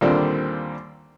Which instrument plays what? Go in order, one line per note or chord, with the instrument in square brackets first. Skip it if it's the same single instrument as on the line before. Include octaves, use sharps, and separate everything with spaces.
[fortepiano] D#2 A#2 D3 G3 C4 D4